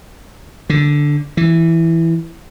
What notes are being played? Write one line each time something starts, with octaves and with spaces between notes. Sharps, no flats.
D3
E3